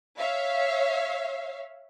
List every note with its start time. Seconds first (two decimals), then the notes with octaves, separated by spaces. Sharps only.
0.18 C#5 E5 F5